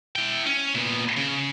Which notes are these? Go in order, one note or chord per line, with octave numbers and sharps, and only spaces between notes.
E4 G5
C#4
A#2 B3
C#3